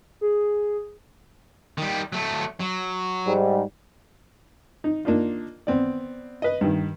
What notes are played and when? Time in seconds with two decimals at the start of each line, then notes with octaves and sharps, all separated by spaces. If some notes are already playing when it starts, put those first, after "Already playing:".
0.21 G#4
1.78 D#3 G3
2.12 F#3 A3
2.60 F#3
3.25 G#2 G3
4.84 D#4
5.05 A#3 D4 D#4 F4
5.67 B3 C4 D5
6.42 B4 D#5
6.61 G2 D#3